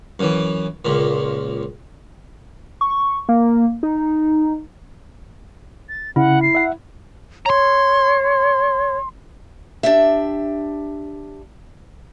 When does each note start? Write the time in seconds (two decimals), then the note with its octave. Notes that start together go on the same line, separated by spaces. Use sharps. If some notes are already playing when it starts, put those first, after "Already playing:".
0.19 F#2 E3
0.85 C#2 A#2
2.81 C#6
3.29 A#3
3.83 D#4
5.89 A6
6.16 C#3 E4 F#5
6.42 C7
6.55 E5 F#5
7.46 C#5 A#5 C6
9.83 D4 G4 E5